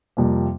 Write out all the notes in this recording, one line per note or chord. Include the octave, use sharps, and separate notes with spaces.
F2 C3 G3 A#3